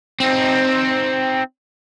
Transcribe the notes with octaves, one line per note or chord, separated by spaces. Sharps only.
C4 D#4